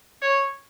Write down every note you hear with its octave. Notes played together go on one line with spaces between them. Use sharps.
C#5